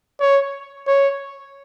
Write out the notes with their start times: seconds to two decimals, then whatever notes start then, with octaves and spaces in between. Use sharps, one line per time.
0.20 C#5
0.88 C#5